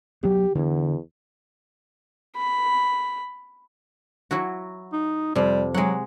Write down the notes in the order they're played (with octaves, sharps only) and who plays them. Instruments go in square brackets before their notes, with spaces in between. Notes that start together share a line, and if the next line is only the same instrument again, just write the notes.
[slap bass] D2 F#3 B3 [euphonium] G4
[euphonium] E2 [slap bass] D3
[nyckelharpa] B5
[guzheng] F#3 E4 F#4
[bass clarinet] D#4
[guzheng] F2 C3 [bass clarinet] G3
[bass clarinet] F#3 [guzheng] G#3 F#5